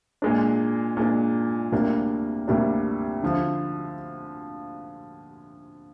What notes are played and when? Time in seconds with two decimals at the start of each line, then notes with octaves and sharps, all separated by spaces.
0.22 A#2 G#3 D4
0.97 A#2 G#3 D4
1.72 D2 C3 G3 A#3 D4
2.48 D2 C3 G3 A#3 D4
3.23 D3 F3